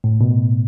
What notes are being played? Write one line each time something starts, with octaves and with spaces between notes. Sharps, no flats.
A2
B2